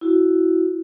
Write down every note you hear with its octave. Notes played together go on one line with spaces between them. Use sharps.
E4 F#4